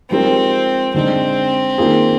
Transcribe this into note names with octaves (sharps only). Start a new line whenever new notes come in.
F3 G#3 C4 D#4 G4 A#4
D3 G#3 C4 D#4
D#3 A#3 F4 G#4